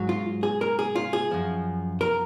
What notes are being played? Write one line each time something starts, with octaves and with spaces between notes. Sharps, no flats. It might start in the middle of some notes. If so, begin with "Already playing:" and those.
Already playing: G#2 F#3
F4
G#4
A#4
G#4
F4
G#4
F#2 F3
A#4